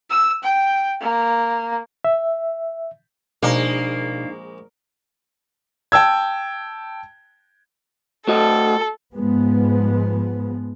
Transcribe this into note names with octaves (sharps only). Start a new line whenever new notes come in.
E6
G5
A#3
E5
A#1 B2 G#3 A#3 D4 D#4
G5 A5 E6 G#6
A3 F#4 A4 D#5
G#2 F3 G#3 B3